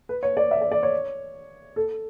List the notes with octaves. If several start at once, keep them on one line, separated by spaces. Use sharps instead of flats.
B4
C#5
D5
E5
D5
D5
C#5
A4